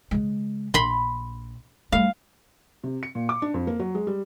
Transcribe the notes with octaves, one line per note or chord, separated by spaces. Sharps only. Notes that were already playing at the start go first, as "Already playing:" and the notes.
C#3 G#3
A#1 B5 C6
G3 A3 F5
C3
C#7
A#2
D6
D4
F2
A#3
F#3
G#3
G3